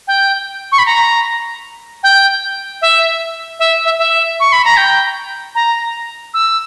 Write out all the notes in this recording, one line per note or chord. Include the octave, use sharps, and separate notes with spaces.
G5
C#6
B5
A#5
G5
E5
E5
E5
E5
C#6
B5
A#5
G5
A#5
E6